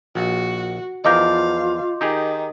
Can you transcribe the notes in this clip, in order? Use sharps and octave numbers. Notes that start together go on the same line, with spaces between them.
A#1 F#4
E2 F3 F4 A#4 D#5 F5 D6 G6
D#3 D#4 G4 G#4